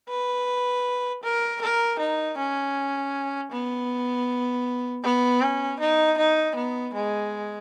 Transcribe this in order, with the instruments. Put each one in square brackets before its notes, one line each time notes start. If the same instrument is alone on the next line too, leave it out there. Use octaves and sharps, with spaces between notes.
[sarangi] B4
A#4
A#4
D#4
C#4
B3
B3
C#4
D#4
D#4
B3
G#3